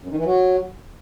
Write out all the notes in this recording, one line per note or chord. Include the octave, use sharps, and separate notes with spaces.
F#2
D#3
E3
F#3